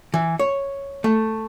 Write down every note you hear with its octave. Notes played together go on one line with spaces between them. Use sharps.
E3
C#5
A3